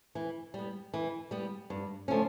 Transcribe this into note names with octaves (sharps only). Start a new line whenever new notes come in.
E3
G3 B3
E3
G3 B3
G2
D3 F3 A3 C#4